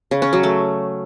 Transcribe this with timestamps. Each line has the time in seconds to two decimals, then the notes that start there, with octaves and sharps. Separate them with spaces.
0.11 C#3
0.22 C#4
0.33 F#3
0.43 A3